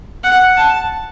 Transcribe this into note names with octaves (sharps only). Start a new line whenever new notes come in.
F#5
A5